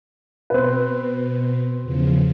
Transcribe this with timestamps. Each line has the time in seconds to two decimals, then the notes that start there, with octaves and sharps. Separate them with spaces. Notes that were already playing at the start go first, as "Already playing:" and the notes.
0.50 B2 C4 B4
1.83 E2 C#3 F3